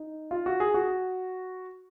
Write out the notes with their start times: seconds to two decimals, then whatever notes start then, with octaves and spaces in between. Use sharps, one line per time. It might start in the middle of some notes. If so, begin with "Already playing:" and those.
Already playing: D#4
0.31 F4
0.46 F#4
0.60 G#4
0.74 F#4